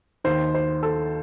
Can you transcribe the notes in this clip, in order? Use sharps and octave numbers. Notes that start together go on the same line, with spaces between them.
D#2 D#3 C5
C5
A4